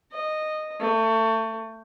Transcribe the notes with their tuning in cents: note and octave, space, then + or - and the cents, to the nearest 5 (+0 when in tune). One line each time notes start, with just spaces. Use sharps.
D#5 -10
A3 +25